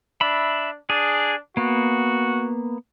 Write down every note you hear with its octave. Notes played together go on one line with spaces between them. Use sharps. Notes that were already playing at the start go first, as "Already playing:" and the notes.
D4 E5 B5
D4 G#4
A#3 B3 F#4